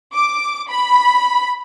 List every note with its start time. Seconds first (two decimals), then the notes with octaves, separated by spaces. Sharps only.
0.13 D6
0.69 B5